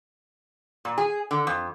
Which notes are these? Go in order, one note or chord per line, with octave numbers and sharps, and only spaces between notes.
A#2
G#4
D3
F2